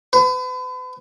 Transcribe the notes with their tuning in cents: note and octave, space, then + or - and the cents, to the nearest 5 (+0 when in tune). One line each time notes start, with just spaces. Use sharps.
B4 +40